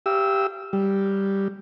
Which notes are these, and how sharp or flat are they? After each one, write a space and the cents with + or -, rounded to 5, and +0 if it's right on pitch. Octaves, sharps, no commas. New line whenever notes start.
G4 +0 F5 -45 E6 -20
G3 +0 G4 +0